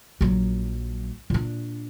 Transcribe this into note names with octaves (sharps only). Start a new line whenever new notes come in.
A#1 F#3
A#2 D4